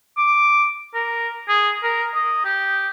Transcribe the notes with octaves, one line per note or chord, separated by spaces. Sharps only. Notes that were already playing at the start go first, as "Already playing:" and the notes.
D6
A#4
G#4
A#4
D#5
G4